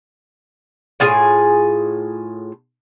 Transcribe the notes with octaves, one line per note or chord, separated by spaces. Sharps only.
A2 F4 G#4 G#5